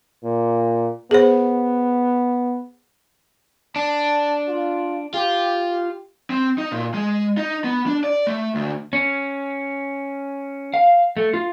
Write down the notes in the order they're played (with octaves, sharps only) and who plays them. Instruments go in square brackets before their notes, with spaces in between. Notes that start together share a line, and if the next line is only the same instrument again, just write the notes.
[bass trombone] A#2
[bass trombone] B3 [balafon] G#4 C5
[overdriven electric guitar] D4 [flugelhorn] A5
[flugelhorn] F4
[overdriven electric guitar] F4 [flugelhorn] G4
[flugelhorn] G4
[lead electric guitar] C4
D#4
A#2
G#3
D#4
B3
D4
D5
A3
D2
[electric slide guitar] C#4
F5
A3
F4